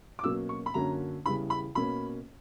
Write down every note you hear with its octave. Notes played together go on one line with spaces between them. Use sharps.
D6
B2 F#3 A#3 C#4 E6
C#6
B5
F#2 D3 F#3 A#3 C#4 A#5
E2 C#3 E3 G3 B5
B5
B2 A#3 C#4 B5